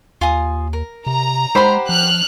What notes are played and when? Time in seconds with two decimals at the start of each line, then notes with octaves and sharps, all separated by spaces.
0.21 D#2 F4 G#5 D#6
0.73 A#4
1.07 C3 A#5
1.55 G#3 G4 C5 F#5 B5 C6
1.89 F3 F6 F#6